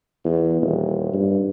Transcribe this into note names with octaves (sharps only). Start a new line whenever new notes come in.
E2
D#1
G2